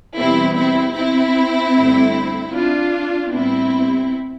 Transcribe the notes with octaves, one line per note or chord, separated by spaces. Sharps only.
E2 B2 G3 B3 C4 E4
C4 E4
C4 E4
G2 D3 A3
D4 F4
A2 G3 B3 C4 E4